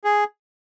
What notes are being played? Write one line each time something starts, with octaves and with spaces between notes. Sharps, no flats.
G#4